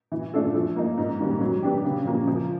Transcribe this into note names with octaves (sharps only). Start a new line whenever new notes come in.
E3
A3 D4 F4 A4
F3
A#3 D#4
G#2
D#3 G3 A#3 C#4
F#3
B3 D4 G4
C#3
F3 A#3 C#4
F3